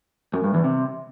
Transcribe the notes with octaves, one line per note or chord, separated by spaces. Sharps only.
F#2
G2
E2
C3